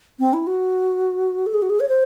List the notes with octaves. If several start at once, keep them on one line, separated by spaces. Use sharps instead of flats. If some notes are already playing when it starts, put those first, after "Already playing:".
C4
E4
F#4
A4
G#4
F#4
G#4
C#5
C5